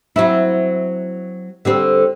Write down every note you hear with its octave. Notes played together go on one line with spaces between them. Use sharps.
F#3 C4 E4
D3 G3 C4